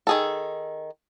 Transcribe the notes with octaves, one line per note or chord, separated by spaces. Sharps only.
D#3 G#4 A4